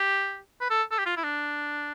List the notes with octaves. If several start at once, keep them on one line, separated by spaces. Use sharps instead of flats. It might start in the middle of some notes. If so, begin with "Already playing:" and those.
Already playing: G4
B4
A4
A4
G4
F4
E4
D4